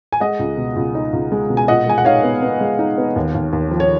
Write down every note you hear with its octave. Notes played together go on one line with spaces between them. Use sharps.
G#5
G#3 D#5 F#5
C#2
B2
C#2
D#4
C#2
G#3
B2
G#5
A#2 D#5 F#5
G#3 G#5
F#5
D#4 C#5 F5
B3
B3
G#3
D#4
B3
D#2
D#2
D#2
F3
C#5